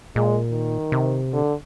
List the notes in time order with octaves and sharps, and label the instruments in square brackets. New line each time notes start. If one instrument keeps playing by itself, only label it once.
[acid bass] A#2 [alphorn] G#3
[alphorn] D#3
[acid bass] C3
[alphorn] D3